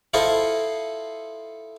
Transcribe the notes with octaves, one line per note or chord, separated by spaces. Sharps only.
E4 F4 A4 C5 D#5